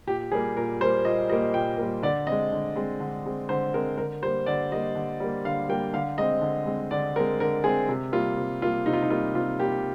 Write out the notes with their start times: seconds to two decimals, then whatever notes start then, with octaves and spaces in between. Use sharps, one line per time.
0.07 A#2 G4
0.32 G3 A#3 G#4
0.57 A#2 A#4
0.81 G3 C5
0.85 A#3
1.05 A#2 D#5
1.29 G3 A#3 D#5
1.54 A#2 G5
1.78 G3 A#3
2.03 D3 D5
2.27 G#3 C4 D#5
2.52 D3
2.76 G#3 C4
3.00 D3
3.26 G#3 C4
3.49 D3 C5
3.74 G#3 C4 A#4
3.98 D3 A#4
4.22 G3 C5
4.25 A#3
4.46 D3 D5
4.72 G3 A#3 D#5
4.95 D3
5.20 G3 A#3
5.45 D3 F5
5.69 G3 A#3 G5
5.93 D3 F5
6.18 G#3 C4 D#5
6.42 D3
6.66 G#3 C4
6.91 D3 D5
7.16 C4 A#4
7.20 G#3
7.40 D3 A#4
7.64 G#3 C4 G#4
7.89 C3
8.12 G3 A#3 F4
8.37 C3
8.62 G3 A#3 F4
8.86 C3 D#4
8.93 F4
9.02 D#4
9.10 G3 A#3 F4
9.35 C3 F4
9.60 A#3 G4
9.63 G3